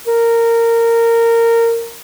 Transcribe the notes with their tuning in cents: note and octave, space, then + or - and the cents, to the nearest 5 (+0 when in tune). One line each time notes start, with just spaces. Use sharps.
A#4 -15